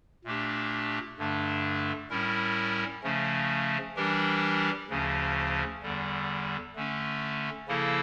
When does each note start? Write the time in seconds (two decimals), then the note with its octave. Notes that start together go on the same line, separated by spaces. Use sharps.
0.25 A#2 A3 D4 G4
1.18 G2 D3 A3 D4
2.10 A2 G3 C#4 E4 A#4
3.03 C#3 F3 A3 C#4
3.96 E3 G3 D4 G4 A#4
4.90 D2 C#3 F3 C#4
5.82 E2 D3 G3
6.75 D3 A3 C#4
7.68 C#3 F3 A#3 E4 A4